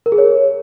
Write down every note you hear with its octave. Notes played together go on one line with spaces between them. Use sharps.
A#4
G#4
C#5